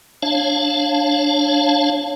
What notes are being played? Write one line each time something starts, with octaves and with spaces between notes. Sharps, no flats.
D4 C#5 F5 A5